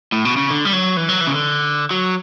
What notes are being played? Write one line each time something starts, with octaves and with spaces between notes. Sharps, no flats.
A2
B2
C#3
D3
G3
F#3
E3
F#3
E3
C#3
D3
F#3